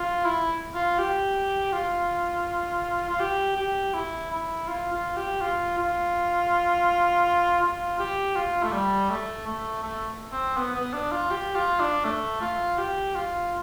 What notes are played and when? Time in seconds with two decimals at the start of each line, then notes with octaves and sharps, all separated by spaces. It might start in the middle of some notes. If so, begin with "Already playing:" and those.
Already playing: F4
0.25 E4
0.74 F4
0.98 G4
1.72 F4
3.09 F4
3.20 G4
3.56 G4
3.93 E4
4.31 E4
4.67 F4
4.92 F4
5.16 G4
5.41 F4
5.78 F4
7.62 F4
7.99 G4
8.35 F4
8.63 A3
8.72 G3
9.10 A3
9.47 A3
9.83 A3
10.32 C4
10.57 B3
10.75 B3
10.93 D4
11.12 F4
11.30 G4
11.55 F4
11.80 D4
12.04 A3
12.41 F4
12.78 G4
13.15 F4